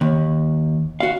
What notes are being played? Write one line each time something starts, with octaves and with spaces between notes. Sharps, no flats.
D#2
F#4 F5